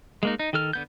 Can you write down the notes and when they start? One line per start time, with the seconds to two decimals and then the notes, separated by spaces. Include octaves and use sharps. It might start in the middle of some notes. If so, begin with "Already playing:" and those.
0.23 G#3 A#3 D#4
0.39 D#4
0.53 D#3 A4 F6
0.73 D3 B3 G6